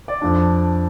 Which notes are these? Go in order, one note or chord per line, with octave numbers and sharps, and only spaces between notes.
D5
F2 F3 D4